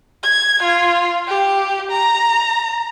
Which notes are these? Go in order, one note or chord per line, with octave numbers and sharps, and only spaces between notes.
G#6
F4
G4
A#5